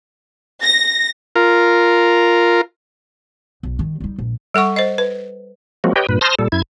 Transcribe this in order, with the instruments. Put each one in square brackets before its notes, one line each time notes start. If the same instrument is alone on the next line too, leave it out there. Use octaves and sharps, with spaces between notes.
[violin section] A#6
[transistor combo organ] F4 A#4
[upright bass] B1
D#3
G3 D#4
A#1
[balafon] G3 A4 F#5 C#6
C5 D#5
B4
[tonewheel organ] F3 F#3 G#3 A#3 C4 F#4
G4 B4 C#5 D#5 G5
G2 A#2 B4
C5 A5 C6 D#6 F6 A#6
A#2 G3 A4
F#2 E4 G#6